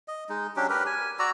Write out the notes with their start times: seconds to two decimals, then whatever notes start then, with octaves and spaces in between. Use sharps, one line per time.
0.08 D#5
0.29 G#3 D#4
0.56 F#3 C#4 D4 G4
0.70 G4 A#4 B4
0.86 G#5
1.19 F#4 D5 A#5 E6